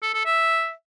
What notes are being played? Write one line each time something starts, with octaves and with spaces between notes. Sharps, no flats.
A4
A4
E5